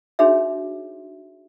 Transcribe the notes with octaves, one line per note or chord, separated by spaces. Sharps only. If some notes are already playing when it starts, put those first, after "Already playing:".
D4 D#4 F#4 G#4 C#5 E5